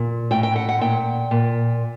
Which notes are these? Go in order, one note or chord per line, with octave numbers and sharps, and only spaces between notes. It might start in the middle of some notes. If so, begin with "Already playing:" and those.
Already playing: A#2
A2 G5
G5
F#5
F#5
A#2 G5
A#2